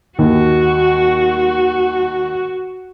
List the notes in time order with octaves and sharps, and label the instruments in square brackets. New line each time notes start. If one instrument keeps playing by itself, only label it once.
[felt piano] D#2 [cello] F#4